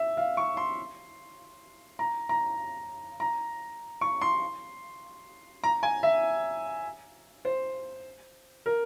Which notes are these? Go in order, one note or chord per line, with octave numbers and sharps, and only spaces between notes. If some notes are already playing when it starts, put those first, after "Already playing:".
Already playing: E5
F5
C#6
C6
A#5
A#5
A#5
C#6
C6
A#5
G#5
E5
C5
A#4